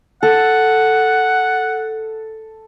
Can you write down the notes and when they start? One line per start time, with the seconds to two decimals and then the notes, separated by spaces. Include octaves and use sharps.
0.23 A4 F#5